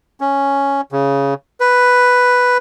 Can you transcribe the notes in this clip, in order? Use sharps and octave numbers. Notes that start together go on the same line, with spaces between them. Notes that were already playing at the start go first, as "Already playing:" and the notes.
C#4
C#3
B4